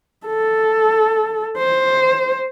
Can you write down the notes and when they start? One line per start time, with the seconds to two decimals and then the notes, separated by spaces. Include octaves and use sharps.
0.27 A4
1.57 C5